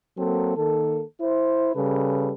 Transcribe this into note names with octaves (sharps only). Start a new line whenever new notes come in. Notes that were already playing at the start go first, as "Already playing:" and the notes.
F#3 A#3 C4 A4
D#3 A#3 A4
E4 C5
C#3 G3 A4 B4